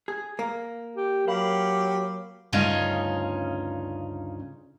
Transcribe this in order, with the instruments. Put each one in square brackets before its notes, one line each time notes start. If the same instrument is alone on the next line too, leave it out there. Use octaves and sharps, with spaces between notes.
[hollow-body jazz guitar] G#4
A#3
[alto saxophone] G4
[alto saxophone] F#3 [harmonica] G4 [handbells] A#4 F5 B5
[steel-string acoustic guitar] D2 G2 C#3 C#4 D#4 F4